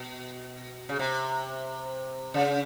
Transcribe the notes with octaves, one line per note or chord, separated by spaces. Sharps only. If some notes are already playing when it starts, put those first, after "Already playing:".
Already playing: B2
C#3
C3
C#3